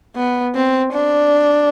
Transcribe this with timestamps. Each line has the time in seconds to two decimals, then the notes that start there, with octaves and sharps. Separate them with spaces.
0.16 B3
0.55 C4
0.93 D4